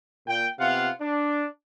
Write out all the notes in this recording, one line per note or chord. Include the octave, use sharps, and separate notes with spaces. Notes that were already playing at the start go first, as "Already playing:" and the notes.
A#2 G5
C3 B3 F4 F5 F#5
D4